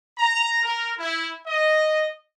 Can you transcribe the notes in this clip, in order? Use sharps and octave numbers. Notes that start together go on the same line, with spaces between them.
A#5
A#4
E4
D#5